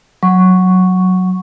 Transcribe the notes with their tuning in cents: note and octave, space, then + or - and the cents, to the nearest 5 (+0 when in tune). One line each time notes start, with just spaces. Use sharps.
F#3 +0 C#6 +0